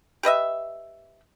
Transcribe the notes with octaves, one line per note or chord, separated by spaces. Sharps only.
G4 B4 D#5 E5